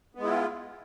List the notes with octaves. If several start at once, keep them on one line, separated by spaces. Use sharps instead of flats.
G#3 B3 E4 F4